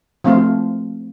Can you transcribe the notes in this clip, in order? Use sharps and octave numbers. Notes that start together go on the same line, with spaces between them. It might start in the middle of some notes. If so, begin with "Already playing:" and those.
F3 A3 C4 F4